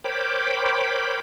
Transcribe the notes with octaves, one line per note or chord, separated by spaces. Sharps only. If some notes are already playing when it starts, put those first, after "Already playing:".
A#4 C5 C#5 G5 B5 D6